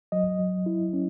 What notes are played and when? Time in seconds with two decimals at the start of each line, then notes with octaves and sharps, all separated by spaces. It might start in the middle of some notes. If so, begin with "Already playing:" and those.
0.12 F#3 D#5
0.39 F#3
0.66 E4
0.93 C#4